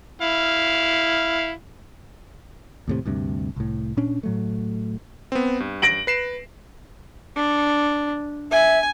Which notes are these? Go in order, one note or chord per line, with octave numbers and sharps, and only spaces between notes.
E4 F5
D#2 A2 C3
D2 G2 C3
C2 A2
A#2 C#4 D4
A2 F#3 A3
B3 C4
G2
A#6 D7 F#7
B4 C7 E7
D4
E5 G#5